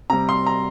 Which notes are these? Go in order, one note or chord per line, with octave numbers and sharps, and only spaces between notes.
C3 G3 A#5
C6
A#5